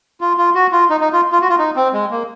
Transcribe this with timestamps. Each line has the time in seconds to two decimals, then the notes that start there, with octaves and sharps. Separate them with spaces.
0.21 F4
0.38 F4
0.55 F#4
0.72 F4
0.90 D#4
1.01 D#4
1.13 F4
1.32 F4
1.41 F#4
1.49 F4
1.58 D#4
1.76 C4
1.93 G#3
2.11 A#3